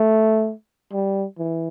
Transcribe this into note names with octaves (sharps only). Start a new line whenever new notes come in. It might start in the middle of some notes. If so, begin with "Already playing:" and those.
Already playing: A3
G3
E3